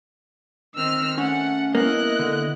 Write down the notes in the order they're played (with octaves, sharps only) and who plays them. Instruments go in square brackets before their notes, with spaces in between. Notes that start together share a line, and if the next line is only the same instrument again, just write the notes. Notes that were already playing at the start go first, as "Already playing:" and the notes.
[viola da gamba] D#3 C4 [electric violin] E6 F6
[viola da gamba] A3 [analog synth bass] C#4 [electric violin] F#5
[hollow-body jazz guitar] A#3 [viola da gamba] B3 E4 [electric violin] D#5 F#6
[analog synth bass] D3